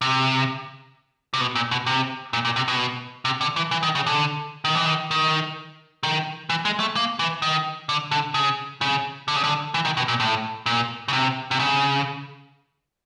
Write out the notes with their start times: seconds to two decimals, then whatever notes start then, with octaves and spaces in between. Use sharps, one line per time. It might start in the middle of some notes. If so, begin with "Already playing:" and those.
0.01 C3
1.34 C3
1.41 B2
1.55 A#2
1.71 B2
1.86 C3
2.33 A#2
2.45 A#2
2.56 C3
2.68 B2
3.25 C3
3.41 D3
3.56 E3
3.71 E3
3.83 D#3
3.95 C#3
4.06 D3
4.65 D#3
4.75 E3
4.86 D#3
5.11 D#3
6.03 D#3
6.50 E3
6.65 G#3
6.80 A3
6.96 A#3
7.19 E3
7.42 D#3
7.89 D3
8.11 D3
8.34 C#3
8.81 C#3
9.28 D3
9.36 C#3
9.44 D3
9.74 E3
9.85 D#3
9.97 B2
10.08 A#2
10.20 A2
10.66 A#2
11.08 C#3
11.13 C3
11.51 C3
11.59 C#3